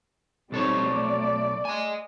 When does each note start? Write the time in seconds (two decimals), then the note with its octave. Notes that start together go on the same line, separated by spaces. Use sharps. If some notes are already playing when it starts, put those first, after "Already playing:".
0.52 B1 G3 C4 D#4 A4 C#5
0.84 A3 D5
1.65 D#5 G#5